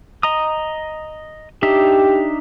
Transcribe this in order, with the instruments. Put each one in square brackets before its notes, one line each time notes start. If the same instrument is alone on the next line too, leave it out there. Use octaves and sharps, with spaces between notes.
[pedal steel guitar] D#5 A#5 D#6
[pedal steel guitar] D4 D#4 E5 [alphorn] G4